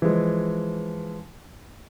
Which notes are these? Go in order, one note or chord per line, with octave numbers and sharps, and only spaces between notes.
E3 F3 G#3